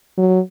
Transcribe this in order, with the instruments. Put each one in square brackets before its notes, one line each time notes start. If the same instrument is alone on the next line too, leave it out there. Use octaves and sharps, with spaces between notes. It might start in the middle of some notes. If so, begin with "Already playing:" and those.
[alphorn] F#3